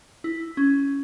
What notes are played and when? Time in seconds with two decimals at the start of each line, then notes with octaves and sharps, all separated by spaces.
0.24 E4
0.57 C#4